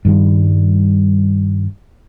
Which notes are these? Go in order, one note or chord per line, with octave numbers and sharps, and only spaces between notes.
G2 D#3 G3